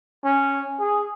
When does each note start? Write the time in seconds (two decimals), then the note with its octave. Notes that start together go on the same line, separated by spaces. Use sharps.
0.24 C#4
0.80 G#4